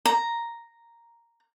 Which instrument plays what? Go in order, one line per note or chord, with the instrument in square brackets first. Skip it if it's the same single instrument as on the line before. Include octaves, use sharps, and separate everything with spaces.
[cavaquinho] A#5